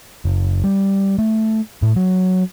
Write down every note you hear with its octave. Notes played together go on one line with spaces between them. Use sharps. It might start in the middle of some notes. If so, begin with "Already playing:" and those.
F#1
G3
A3
A2
F#3